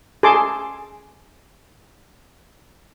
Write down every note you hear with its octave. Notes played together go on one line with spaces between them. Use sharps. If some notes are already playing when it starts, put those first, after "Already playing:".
G#4 A4 G#5 A5 C6 D6